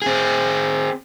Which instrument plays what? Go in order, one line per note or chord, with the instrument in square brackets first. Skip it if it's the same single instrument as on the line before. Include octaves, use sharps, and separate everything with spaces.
[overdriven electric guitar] C4 G#4